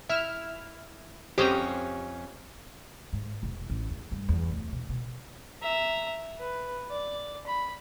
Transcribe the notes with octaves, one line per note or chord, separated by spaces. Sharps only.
E4 E5 F6
F2 C#4 G4 C5 A#5 D#6
G#2
E1
A1
E2
G2
E2
D1
B2
B2
E5 A#5
B4
D5
B5